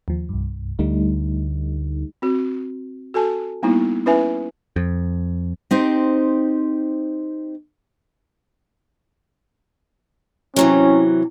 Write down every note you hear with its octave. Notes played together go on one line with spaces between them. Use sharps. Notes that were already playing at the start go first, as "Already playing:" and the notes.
D#2 F3
C2 G2
D2 G3 A3 D#4
C4 F#4
F#4 A4 G#5 A5
G3 A#3 B3 D#4 E4
C#4 E4 B4 E5 G#5
F2
C4 D#4 G4 C5
C3 E3 F#3 C#4